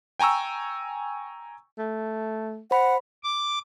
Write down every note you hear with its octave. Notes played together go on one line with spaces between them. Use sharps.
G5 G#5 A#5 C#6 E6
A3
C5 F#5 B5
D6